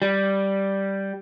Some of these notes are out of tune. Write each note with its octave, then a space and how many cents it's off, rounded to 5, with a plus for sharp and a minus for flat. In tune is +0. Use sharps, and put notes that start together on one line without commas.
G3 -5